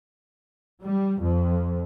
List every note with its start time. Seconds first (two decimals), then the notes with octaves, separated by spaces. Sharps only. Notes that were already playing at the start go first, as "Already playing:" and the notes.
0.83 G3
1.20 F2